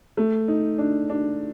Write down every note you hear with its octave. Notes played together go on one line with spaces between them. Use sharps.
A3
D#4
D4
D4